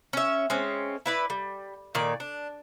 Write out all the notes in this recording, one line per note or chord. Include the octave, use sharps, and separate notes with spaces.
C#4 E5
G#3 C4 C#4
E4 B4 D5
G3
A#2 D#3 D5
D4